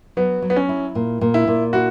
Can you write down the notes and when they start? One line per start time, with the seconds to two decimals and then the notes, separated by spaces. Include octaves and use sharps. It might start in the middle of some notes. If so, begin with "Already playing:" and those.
0.17 F#3 B3
0.42 F#3
0.50 B3
0.56 C#4
0.69 E4
0.95 A#2
1.21 A#2
1.34 E4
1.48 A#2
1.73 E4 F#4